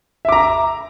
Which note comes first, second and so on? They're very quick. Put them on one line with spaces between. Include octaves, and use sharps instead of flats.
E5 D6 A#5